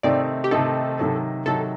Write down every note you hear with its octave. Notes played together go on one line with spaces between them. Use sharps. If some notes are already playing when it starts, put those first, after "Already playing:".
C3 D#3 A3 C4 D#4 D5
G4
C3 D#3 A3 C4 D#4 A4
C3 D#3 F#3
C3 D#3 F#3 A4